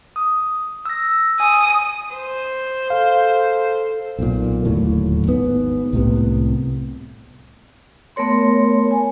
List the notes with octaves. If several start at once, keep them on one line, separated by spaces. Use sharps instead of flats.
D#6
E6 A#6
G#5 D#6
C5
A4 F5
B1 A#2
D1 D#2 A2 F#3
G#1 G#2 B3
C2 A2 C3 B3
A3 B3 A#4 C#5 C6
G#5